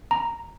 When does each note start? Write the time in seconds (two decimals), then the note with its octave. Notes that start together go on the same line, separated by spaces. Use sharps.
0.11 A#5